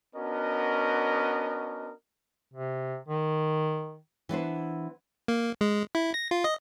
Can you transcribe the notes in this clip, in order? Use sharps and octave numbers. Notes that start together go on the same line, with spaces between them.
B3 C#4 D4 F#4 A#4 D#5
C3
D#3
E3 B3 D4 C5
A#3
G#3
E4
A#6
F4
D#5